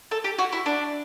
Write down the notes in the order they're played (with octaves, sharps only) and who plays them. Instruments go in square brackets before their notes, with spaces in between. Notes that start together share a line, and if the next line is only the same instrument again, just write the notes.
[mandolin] A4
G4
F#4
E4
D4